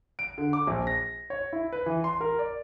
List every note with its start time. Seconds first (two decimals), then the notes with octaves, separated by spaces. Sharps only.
0.19 D7
0.38 D3
0.53 D6
0.67 A#1
0.87 A#6
1.30 C#5
1.53 E4
1.72 B4
1.86 E3
2.04 C6
2.21 A#4
2.39 D5